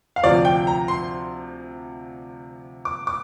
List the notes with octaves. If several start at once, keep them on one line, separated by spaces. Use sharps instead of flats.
F5
D2 C3 F3 D5
G5
A#5
C6
D6
D6